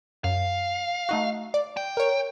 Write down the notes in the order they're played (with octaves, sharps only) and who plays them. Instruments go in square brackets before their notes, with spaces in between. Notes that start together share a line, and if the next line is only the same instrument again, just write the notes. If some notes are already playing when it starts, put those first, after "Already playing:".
[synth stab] F#2 [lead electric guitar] F5
[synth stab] A3 D#4 F#4
D5
[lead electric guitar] G5
[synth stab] A#4 C#5